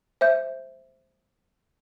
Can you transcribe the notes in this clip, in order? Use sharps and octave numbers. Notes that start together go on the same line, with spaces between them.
C5 E5 G6